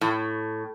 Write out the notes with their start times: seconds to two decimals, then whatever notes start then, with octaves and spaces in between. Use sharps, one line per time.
0.01 A2